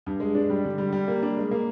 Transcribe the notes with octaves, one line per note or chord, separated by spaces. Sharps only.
G2
G#3
D4
G3
D3
G3
G3
A#3
D4
G#3
A#3